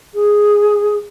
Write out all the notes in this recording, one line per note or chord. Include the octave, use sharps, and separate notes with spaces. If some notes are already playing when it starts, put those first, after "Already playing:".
G#4